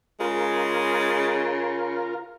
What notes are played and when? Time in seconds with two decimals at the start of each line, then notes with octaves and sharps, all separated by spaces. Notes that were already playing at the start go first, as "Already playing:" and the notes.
0.20 C#3 G#3 F4 A#4